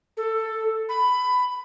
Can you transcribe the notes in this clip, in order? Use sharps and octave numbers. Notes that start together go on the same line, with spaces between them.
A4
B5